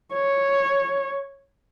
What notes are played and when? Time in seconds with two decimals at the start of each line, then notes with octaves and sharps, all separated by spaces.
0.14 C#5